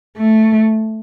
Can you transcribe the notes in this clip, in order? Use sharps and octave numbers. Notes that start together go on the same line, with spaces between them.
A3